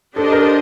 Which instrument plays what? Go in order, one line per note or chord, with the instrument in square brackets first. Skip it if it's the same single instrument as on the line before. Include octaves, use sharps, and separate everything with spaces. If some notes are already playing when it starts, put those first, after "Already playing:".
[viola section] D4 G4 C5 D#5 [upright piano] A4
[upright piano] A#4